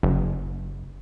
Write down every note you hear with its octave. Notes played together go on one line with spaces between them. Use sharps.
F#1